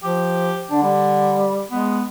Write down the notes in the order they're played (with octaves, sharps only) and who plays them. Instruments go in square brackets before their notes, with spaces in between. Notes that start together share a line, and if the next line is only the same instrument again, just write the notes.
[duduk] F3 [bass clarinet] G4
[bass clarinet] D3 [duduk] D4
[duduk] G3
[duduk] G#3 [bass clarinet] B3